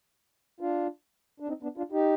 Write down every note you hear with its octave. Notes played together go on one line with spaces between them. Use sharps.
D4 F4
D4
C4 D#4
B3 D4
D4 F4
D#4 G4